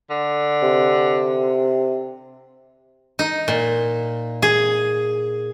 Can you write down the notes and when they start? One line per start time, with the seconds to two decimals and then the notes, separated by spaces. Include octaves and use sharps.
0.10 D3
0.62 C3
3.19 D#4
3.48 A#2
4.42 G#4